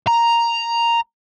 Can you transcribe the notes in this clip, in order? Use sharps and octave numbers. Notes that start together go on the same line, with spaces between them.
A#5